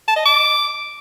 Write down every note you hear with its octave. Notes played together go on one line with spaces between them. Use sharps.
A5
D#5
D6